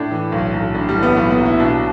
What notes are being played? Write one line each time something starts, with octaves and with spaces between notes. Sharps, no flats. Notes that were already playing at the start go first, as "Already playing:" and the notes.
Already playing: A2 D4
E3
B1
B1
A2 D4
G3
E3
B3
B1 B3
B3
B1
E4
B2 D4